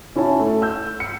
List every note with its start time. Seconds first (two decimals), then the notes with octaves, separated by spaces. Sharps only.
0.16 C#4 E4 F#4 C#5 A5
0.40 A3
0.62 E6 G6
1.00 C#7